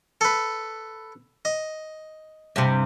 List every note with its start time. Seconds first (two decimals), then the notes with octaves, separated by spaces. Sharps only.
0.21 A4 B4
1.45 D#5
2.56 G2 C3